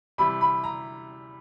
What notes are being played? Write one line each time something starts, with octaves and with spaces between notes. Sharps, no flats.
C3 E3 G3 B5
B5
A#5